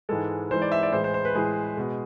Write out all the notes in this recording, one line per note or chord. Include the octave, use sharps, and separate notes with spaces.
G#2 E3 G#3 A4
G#2 E3 G#3 C5
D5
E5
D5
A2 E3 G#3 C5
C5
C5
B4
A2 E3 G#3 G#4
B2 G#3